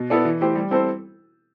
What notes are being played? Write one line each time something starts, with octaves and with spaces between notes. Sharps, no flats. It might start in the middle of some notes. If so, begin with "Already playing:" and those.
Already playing: B2
B3 E4 A4 D5
E3
A3 E4 G4 C5
G3
C4 E4 A4 C5